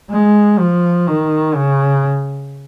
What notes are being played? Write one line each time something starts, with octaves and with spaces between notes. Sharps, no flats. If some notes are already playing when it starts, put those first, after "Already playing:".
G#3
F3
D#3
C#3